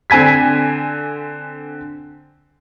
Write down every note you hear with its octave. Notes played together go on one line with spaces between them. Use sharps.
D3 C4 G#5 G#6 B6